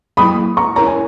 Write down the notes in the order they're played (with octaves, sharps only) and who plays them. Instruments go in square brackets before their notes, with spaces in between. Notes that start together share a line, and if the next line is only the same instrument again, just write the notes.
[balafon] F#3 A#3 E4 [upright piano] B5 D#6
[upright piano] A#5 C#6
[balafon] C#4 E4 A#4 C#5 [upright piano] A#5
[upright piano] G#5